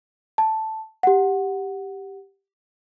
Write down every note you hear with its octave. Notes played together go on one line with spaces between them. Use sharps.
A5
G4 F#5